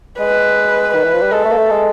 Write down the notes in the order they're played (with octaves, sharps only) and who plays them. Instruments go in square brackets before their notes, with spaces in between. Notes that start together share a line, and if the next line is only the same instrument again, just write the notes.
[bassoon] G#3 [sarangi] B4
[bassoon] D#3 [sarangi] B4
[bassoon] E3
F3
G3
[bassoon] G#3 [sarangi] A4
[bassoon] A3
A#3
A3
G#3